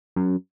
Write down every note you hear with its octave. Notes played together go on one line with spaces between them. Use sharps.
F#2